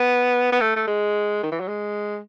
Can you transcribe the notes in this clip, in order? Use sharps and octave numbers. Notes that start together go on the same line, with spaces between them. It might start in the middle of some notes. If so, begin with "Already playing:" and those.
Already playing: B3
B3
A3
A3
G#3
D#3
E3
F#3
G#3